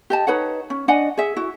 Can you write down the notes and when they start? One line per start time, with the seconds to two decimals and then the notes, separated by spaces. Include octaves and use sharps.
0.10 G4 D#5 A5
0.27 D#4 B4 C#5 F#5
0.70 C#4
0.88 D4 D#5 F#5 G#5
1.17 G#4 E5
1.37 E4 F#4